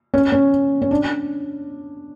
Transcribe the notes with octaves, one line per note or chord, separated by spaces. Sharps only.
C#4
C#4
C#4
D4